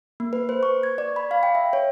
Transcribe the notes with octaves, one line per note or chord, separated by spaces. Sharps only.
A#3
B4
C5
C#6
G#6
D5
B5
F5
G5
E5
C#5